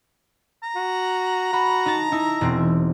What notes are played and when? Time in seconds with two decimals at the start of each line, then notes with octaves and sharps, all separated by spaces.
0.63 A#5
0.76 F#4
1.53 F#4 B5
1.86 D#4 A5
2.12 D#4 E4
2.41 E1 C4